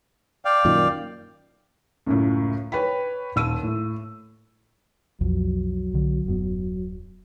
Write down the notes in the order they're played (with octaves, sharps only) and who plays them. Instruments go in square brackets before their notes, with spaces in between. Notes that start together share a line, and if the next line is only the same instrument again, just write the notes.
[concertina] D5 F5 G5
[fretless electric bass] F#2 A#2 D#3
[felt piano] C#2 F#2 A2
B4 C#5 G5 B5
D#1 E6 D#7
A2
[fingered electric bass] B1 F2 [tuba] F#3
[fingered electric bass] B1 D3
D#1 F#2 B3